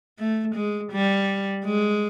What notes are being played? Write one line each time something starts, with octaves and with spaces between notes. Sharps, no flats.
A3
G#3
G3
G#3